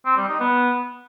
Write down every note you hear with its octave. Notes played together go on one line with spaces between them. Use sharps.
C4
G3
D#4
B3